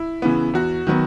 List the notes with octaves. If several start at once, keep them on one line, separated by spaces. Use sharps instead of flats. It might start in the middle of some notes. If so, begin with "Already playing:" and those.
Already playing: E4
C#3 E3 B3
E2 F#4
D#3 F#3 B3